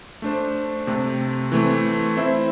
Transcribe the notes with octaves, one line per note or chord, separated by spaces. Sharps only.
A3 D4 C5
C3 A3 C4
E3 A3 C4
C4 E4 C5 E5